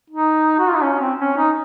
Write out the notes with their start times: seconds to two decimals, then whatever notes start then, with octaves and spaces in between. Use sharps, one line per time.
0.10 D#4
0.59 F#4
0.68 F4
0.75 D#4
0.83 C#4
1.00 C4
1.20 C#4
1.37 D#4